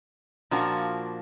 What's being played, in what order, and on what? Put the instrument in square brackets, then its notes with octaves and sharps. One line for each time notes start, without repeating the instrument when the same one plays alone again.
[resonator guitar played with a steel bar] A#2 F3 A#3 D4 F#4